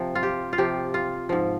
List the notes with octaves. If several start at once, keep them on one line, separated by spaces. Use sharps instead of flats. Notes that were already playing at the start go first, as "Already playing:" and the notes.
Already playing: C3 F3
F4
G4
F4
C3 F3 G4
F4
G#2 F3